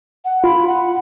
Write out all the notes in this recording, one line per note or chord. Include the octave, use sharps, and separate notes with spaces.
F#5
F4 B5
F#5